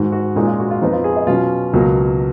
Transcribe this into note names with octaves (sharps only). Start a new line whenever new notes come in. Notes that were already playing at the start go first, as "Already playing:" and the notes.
Already playing: G#2 D#3 G#3 F#4
F#4
A#2 G#3 C#4 D#4
F4
F#4
F4
F2 F3 B3 D#4
F4
G#4
D#5
B2 F#3 C#4 F4
C#2 B2 F#3 A#3